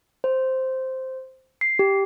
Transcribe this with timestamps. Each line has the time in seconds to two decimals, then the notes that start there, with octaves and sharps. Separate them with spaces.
0.24 C5
1.61 C7
1.79 G4